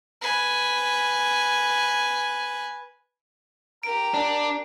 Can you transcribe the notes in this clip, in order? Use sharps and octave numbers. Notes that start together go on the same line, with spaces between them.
B4 G#5
G4 A#4 A#5 D7
D4